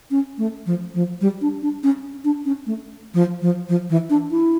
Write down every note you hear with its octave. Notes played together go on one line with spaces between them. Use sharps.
C#4
A3
F3
F3
G3
D4
D4
C#4
D4
C#4
A3
F3
F3
F3
E3
D4
E4